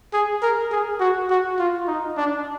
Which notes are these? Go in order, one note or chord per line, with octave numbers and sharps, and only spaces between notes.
G#4
A#4
G#4
F#4
F#4
F4
D#4
D4